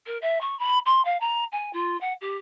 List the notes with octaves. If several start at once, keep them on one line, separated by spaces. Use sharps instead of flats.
A#4
E5
C#6
B5
C6
F5
A#5
G#5
F4
F#5
G4